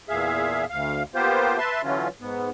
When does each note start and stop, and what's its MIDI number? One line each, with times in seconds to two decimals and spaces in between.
0.09 0.65 40
0.09 0.65 46
0.09 0.65 68
0.09 0.65 76
0.09 0.65 77
0.70 1.03 38
0.70 1.03 77
1.15 1.57 58
1.15 1.57 59
1.15 1.57 65
1.15 1.57 67
1.15 1.57 72
1.58 1.81 71
1.58 1.81 76
1.58 1.81 81
1.58 1.81 84
1.83 2.08 50
1.83 2.08 52
1.83 2.08 54
1.83 2.08 61
1.83 2.08 65
2.21 2.50 44
2.21 2.50 59